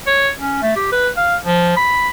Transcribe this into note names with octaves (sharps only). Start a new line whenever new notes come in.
C#5
C#4
A3
G4
B4
F5
F3
B5